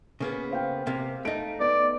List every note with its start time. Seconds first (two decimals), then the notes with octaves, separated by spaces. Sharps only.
0.20 C#3 A#3 B3
0.51 C5 F5 G5
0.87 C3 A#3
1.25 A3 D#4 D7
1.60 B3 D5